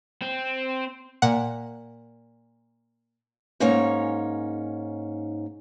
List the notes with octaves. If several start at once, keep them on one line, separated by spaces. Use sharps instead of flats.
C4
A#2 F#5
G#2 A#3 C#4 D#4 C#5